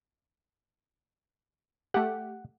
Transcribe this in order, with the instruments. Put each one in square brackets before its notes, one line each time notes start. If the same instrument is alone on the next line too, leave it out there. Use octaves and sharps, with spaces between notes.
[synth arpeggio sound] A3 G4 [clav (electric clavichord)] F#5